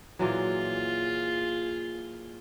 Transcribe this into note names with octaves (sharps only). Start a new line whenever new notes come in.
A#2 E3 F#3 F4 G#4